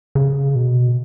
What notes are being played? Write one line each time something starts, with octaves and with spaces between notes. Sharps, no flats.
C#3
B2